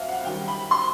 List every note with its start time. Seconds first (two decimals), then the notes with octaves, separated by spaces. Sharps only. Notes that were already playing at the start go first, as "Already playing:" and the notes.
Already playing: F2 F#3 E5 F5
0.08 F#5
0.24 F#2 D#3 G3 G5
0.48 B5
0.71 C6